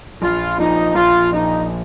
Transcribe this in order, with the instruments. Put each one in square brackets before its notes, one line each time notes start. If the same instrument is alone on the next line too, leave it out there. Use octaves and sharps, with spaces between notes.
[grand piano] A#1 [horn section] F4
[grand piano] A#2 F3 [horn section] D#4
[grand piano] A#1 [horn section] F4
[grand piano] A#2 F3 [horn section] D#4